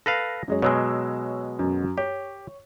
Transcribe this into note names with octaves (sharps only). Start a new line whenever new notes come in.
A4 B4 F5 A#6
F#2 G#3 C#5
B2 F#3 G#3 C#5 E6
F#2
G4 C#5